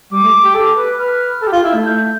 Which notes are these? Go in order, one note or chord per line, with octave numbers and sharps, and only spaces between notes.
G3 D6
A3
G4
A4
B4
B4 F6
A4
G4
F4
E4
A3
G6